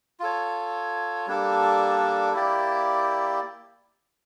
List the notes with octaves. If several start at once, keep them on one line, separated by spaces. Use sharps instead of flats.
F4 A4 C#5
G3 A#3 D4 A4
A#3 E4 G4 D5